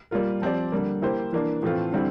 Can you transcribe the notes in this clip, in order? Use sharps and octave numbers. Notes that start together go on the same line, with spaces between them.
G3 A#3 F4 A#4
F3 C4 G4 D5
D3 G3 A#3
A#3 E4 G4 C5
E3 A#3 D4
A2 E3 A3 C4 F4
D3 G3 C4 E4